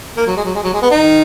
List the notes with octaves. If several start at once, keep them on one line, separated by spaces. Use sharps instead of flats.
A#3
F#3
G#3
F#3
G#3
F#3
G#3
B3
D#3 D#4